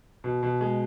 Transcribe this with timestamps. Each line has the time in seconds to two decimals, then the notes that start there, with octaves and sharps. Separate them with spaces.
0.24 B2
0.43 B2
0.61 G#3